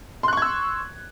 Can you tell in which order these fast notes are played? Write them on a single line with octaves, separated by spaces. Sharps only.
C6 F#6 C#6 G#6 E6